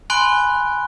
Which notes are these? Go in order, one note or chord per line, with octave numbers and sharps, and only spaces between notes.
G#5 B5 C6 F#6 D7 G7